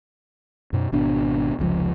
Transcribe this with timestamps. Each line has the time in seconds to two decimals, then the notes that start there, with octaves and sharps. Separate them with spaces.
0.73 F#2 B2
0.92 G#1 B2 D4
1.59 F1 C#2 C3 F3